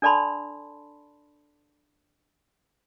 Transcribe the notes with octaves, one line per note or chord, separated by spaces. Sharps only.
D4 A4 D5 A5 B5 C6